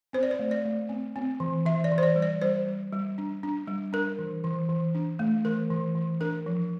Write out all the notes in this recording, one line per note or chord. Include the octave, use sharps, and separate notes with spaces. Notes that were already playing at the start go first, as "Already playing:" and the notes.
C4 C5
D5
C5
A3
D5
A3
C4
C4
E3
E3 E5
D5
E3
C5
D5
G3
D5
G3 C5
G3
G3
D4
D4
G3
D4 A#4
E3
E3
E3
D4
A3
E3 A#4
E3
E3
D4 A#4
F3